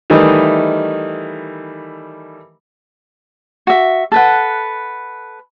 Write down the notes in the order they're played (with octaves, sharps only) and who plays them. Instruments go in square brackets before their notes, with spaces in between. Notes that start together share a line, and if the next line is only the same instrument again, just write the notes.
[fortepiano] D#3 E3 G3 A3 D#4
[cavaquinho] F#4 E5
A4 B4 F#5